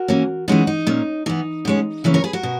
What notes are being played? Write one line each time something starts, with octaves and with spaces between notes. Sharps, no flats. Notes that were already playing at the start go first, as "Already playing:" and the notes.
Already playing: F#4 A#4
E3 A#3 C#4
E3 G#3 C#4 D#4 F#4
D#4
A#2 A#3 C#4
E3 B3 D#4
B2 G#3 C#4
C#3 E3 A#3 C#4
A#4 C#5
G#4 B4
F#4 A#4
B2